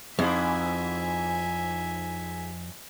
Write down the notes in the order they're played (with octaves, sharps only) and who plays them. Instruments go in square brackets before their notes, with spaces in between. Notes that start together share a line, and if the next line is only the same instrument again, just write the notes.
[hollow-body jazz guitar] F2 [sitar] G#2 E4 G#4 [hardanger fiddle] E5 G#5